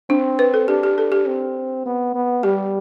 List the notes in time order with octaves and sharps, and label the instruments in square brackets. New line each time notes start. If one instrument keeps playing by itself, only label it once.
[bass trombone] C4 [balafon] D4
[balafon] B4
A4
[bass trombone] D4 [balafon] G4
[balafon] G4
A4
G4
[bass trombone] C4
B3
B3
[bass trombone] G3 [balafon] G4